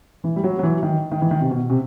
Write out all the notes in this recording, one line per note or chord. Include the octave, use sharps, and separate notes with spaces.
E3
G3
F#3
F#3
E3
D#3
D#3
E3
D#3
C3
B2
C3